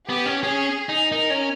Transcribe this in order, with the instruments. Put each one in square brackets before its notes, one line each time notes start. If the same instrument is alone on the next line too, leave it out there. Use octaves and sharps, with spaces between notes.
[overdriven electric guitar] B3 [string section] G4
[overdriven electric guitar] C#4
[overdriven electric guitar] C#4 [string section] G#4
[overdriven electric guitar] D#4
[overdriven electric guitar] D#4 [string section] A#4
[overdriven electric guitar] C#4